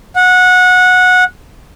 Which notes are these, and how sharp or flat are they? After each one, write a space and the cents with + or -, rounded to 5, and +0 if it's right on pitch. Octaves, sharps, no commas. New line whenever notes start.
F#5 -20